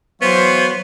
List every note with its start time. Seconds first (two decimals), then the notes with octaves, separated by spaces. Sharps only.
0.22 E3 F#3 B3 C5 C#5 F5